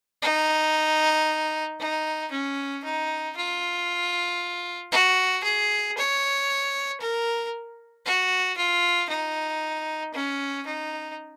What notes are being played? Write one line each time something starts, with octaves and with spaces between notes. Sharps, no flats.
D#4
D#4
C#4
D#4
F4
F#4
G#4
C#5
A#4
F#4
F4
D#4
C#4
D#4